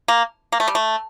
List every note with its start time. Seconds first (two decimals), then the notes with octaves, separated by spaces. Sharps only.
0.08 A#3
0.52 A#3
0.60 A3
0.68 G3
0.75 A3